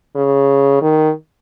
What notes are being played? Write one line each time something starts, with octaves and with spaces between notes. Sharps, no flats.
C#3
D#3